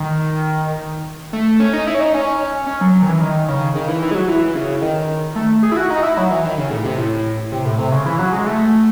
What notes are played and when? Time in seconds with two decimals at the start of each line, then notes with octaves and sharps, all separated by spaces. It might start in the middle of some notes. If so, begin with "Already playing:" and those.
Already playing: D#3
1.33 A3
1.60 C#4
1.73 D#4
1.87 E4
1.95 C#4
2.00 D#4
2.14 C#4
2.67 C#4
2.81 F#3
2.94 F#3
3.02 D#3
3.08 E3
3.21 D#3
3.48 C#3
3.75 D#3
3.88 E3
4.02 E3
4.11 G#3
4.15 F#3
4.28 E3
4.55 C#3
4.82 D#3
5.36 A3
5.63 G#4
5.72 E4
5.77 F#4
5.90 D#4
6.03 E4
6.17 F#3
6.31 E3
6.44 D#3
6.57 C#3
6.71 A2
6.84 C3
6.98 A2
7.52 C3
7.65 A2
7.78 C3
7.92 C#3
8.06 E3
8.19 F#3
8.33 G#3
8.46 A3